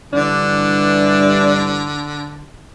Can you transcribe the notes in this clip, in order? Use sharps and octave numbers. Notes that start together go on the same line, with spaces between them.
G2 D3 E3 D4